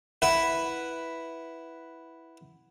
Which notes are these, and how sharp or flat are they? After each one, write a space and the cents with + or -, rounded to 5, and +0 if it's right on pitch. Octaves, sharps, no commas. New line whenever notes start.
E4 +0 B4 +0 F#5 +0